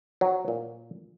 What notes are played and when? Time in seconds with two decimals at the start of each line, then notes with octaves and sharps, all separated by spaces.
0.21 F#3
0.48 A#2